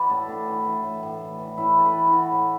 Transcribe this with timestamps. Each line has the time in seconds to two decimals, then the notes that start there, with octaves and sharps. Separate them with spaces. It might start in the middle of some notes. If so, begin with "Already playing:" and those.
Already playing: E3 F#4 B4 D5
0.10 A2 A4
0.28 A2 D4
0.48 E3
0.65 E3
0.84 A2
1.03 A2
1.21 E3
1.39 E3
1.58 A2 E4
1.77 A2 A4
1.86 B4
1.94 E3
2.07 E4
2.13 E3 F#4
2.31 A2